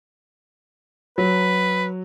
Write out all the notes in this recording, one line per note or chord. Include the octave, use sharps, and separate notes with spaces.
F#3 B4